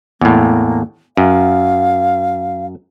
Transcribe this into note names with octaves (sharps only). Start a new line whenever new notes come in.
E2 A2 A#3
F#2 F5